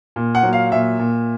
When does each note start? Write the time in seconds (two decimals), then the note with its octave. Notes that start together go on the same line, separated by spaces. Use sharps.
0.16 A#2
0.35 F#5
0.43 F#3
0.53 F5
0.72 A#2 E5
0.99 A#2